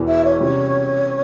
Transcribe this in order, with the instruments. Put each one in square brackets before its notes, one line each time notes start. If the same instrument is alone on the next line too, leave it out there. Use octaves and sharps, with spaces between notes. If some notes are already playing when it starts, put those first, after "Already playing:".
Already playing: [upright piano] E1 E2 E3
[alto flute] E5
C#5
[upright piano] C3 G3 C#4 F4 [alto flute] C#5